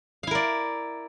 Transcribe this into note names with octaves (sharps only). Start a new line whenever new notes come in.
E4 A#4 D5 F5